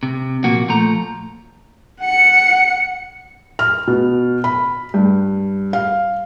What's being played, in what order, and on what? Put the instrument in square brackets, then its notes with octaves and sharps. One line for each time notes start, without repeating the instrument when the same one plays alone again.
[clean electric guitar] C3
A#2 F3 A#3 F#4
A#2 F3 A3 A#5
[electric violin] F#5 C#7
[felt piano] F6
B2
B5
G2
F5